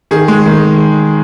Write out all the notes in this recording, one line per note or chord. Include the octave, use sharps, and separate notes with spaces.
D#3 G#4
G#3
D#3